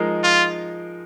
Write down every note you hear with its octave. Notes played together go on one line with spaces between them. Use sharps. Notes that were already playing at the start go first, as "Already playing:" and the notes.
Already playing: F3 G#3 D#4 A#4
F4